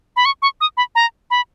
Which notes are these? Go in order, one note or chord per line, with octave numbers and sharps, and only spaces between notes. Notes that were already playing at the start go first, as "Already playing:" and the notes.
B5
C#6
C#6
D#6
B5
A#5
B5